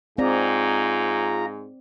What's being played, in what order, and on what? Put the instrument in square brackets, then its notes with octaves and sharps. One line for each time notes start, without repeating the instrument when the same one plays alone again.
[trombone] G#2 [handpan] C4 D5 [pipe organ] F4 G#4 A#5